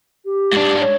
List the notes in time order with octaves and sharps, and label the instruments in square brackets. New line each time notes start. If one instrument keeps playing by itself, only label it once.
[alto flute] G4
[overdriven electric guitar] G#2 D4
[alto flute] C#5